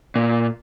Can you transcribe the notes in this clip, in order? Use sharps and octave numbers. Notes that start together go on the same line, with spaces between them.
A#2